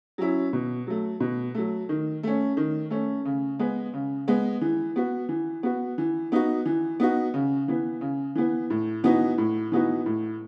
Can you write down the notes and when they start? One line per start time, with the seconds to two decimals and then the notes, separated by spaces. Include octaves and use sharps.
0.18 F#3 C#4 E4
0.53 B2
0.87 F#3 A3
1.20 B2
1.54 F#3 A3
1.89 D#3
2.23 A3 C#4
2.57 D#3
2.90 A3 C#4
3.25 C#3
3.59 G#3 B3
3.94 C#3
4.28 G#3 B3
4.61 E3
4.96 B3 F#4
5.29 E3
5.63 B3 F#4
5.98 E3
6.32 B3 D#4 F#4
6.66 E3
7.00 B3 D#4 F#4
7.34 C#3
7.68 E3 B3
8.01 C#3
8.35 E3 B3
8.70 A2
9.04 E3 B3 D#4 F#4
9.38 A2
9.72 E3 B3 D#4 F#4
10.06 A2